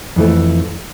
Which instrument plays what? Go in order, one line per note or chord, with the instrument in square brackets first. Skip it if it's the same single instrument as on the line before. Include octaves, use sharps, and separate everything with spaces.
[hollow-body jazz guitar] F2 E3 A3